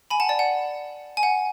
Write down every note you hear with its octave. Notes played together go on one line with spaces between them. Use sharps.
G#5 B5
F#5 A5
D5
F#5
G#5
F#5